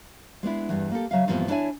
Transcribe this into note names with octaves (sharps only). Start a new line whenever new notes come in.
G#3 B3 D4 E4
E2 G2 E3
A#3 G4 A4
C#3 F#3 E5 F5
G2 A#2 E3 F3 B3 C4
D4 E4 C#5 E5 G#5